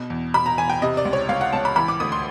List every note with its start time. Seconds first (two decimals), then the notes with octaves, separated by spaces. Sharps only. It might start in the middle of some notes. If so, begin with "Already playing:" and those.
Already playing: B2
0.10 E2
0.34 B2 B5
0.46 A#5
0.58 E2 G#5
0.70 G5
0.82 C3 D#5
0.97 D5
1.05 C#2
1.13 C#5
1.29 C#2 F5
1.41 F#5
1.53 C#2 A5
1.65 B5
1.76 E3 B5
1.88 D6
2.00 D2 D#6
2.12 C6